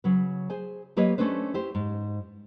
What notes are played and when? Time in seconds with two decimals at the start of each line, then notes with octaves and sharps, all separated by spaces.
0.04 C#3 F#3 B4
0.50 G#4 C5 G#5
0.97 F#3 A#3 G4 B4 C#5 D#5
1.18 A3 C#4 D4 B4 C5
1.54 E4 G4 C5
1.75 G#2